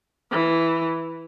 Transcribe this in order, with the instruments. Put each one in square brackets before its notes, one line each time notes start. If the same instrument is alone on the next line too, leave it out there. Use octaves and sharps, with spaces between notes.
[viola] E3